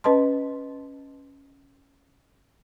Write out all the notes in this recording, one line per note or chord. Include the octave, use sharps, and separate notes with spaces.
C#4 B4 D#5 A5 C6